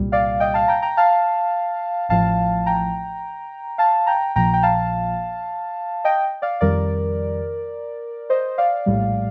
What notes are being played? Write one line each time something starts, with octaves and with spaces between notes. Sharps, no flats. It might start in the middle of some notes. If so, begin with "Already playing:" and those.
Already playing: C2 A#2 G3
D5 F5
D#5 G5
F5 A5
G5 A#5
G5 A#5
F5 A5
A1 A2 F3 F5 A5
G5 A#5
F5 A5
G5 A#5
A#1 A#2 F3 G5 A#5
G5
F5 A5
D#5 G5
D5 F5
F2 D#3 G3 A#4 D5
C5 D#5
D5 F5
A#1 A2 G3